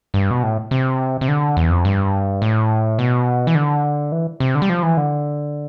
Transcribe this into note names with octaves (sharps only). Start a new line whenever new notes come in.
G2
B2
A2
C3
C3
D3
E2
F2
G2
A2
B2
E3
D3
E3
C3
D3
G3
F3
E3
D3